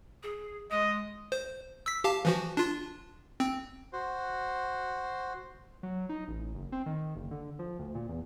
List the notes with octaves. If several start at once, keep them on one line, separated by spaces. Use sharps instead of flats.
G#4
G#3 D#5
C5
E6 B6
G4 F5 A5
E3 F3 F#4
D4 F4
C4
F#4 C5
F#3
D#4
A1
F#1
C4
D#3
F#1
D3
F3
D2
A#2
E2